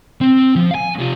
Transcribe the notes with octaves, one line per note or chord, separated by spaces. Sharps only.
C4
F3
F5 G#5
C3 F4